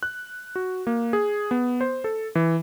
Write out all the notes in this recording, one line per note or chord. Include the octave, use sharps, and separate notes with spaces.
F#6
F#4
A#3
G#4
B3
C5
A4
E3